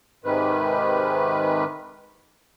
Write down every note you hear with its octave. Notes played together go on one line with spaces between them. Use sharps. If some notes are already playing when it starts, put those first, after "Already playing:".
G#2 C3 D#3 B4